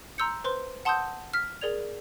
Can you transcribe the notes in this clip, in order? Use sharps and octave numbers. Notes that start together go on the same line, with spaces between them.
A#5 C6 E6 G6 C#7
B4 C5 C6
F#5 A5 C6 D#6 E6 G6
F6 B6
G#4 A#4 D5 G#6 F7